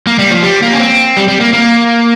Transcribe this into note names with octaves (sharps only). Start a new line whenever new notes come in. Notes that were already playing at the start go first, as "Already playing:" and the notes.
A#3
G3
F3
G3
A#3
C#4
C4
G3
G3
A#3
A#3